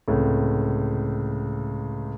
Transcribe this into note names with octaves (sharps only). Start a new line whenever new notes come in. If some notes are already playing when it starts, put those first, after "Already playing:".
C#2 A2 C3